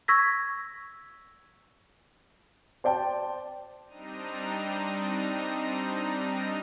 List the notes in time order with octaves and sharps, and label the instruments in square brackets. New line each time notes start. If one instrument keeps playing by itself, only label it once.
[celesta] C#6 E6 G#6 A#6 B6
[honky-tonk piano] C5 D5 G5 A5
[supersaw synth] G3 C4 D4 D#4 A#5 D#7